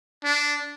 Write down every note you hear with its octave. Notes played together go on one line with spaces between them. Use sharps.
D4